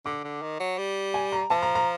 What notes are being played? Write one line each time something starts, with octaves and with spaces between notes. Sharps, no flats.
D3 D6
D3
D#3
F#3
G3
G#5
A#5
F3 A5
A#5
A#5